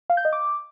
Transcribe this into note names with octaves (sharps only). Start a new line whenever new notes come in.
F5
G6
D#5
D6